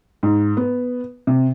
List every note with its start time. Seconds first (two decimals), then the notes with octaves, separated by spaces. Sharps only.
0.23 G#2
0.57 B3
1.27 C3